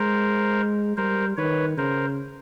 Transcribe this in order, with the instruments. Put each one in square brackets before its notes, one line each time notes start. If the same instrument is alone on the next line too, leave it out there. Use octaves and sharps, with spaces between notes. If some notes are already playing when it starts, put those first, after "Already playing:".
Already playing: [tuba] G#3 [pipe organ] A#4 C5
[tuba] G3 [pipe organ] A#4 C5
[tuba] D#3 [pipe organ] B4 C#5
[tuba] C#3 [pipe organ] A#4 C5